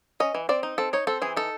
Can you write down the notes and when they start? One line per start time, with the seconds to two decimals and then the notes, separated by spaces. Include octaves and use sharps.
0.20 C#4 D#5
0.35 E3
0.49 C4 D5
0.63 D#4
0.78 C4 A4
0.93 D#4 C#5
1.07 C4 A4
1.22 E3 G#4
1.37 D#4 A4